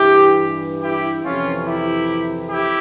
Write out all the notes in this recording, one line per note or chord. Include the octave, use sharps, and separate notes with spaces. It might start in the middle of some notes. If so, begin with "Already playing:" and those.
Already playing: G2 E3 E4 G4
E4 G4
F2 C3 E3 C#4 F4
E4 G4
E4 G4